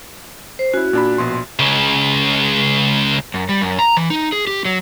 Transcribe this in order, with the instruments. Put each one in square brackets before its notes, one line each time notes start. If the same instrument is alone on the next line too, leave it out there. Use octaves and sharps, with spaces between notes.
[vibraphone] C5
[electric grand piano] C#4 E4 [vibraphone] F#4
[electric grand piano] A#2 D4 B5
A#1 B2 C6
[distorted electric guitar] C#2 C#3
[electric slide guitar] F#2
G3
F#2
A#5
E3
D#4
G#4
G4
F#3